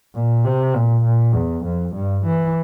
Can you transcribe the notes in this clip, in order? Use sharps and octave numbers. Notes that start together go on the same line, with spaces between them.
A#2
C3
A#2
A#2
E2
F2
G2
E3